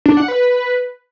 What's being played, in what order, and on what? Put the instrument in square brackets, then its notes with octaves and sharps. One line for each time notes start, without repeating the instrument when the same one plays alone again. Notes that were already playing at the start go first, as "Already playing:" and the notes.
[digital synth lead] D4
F#5
B4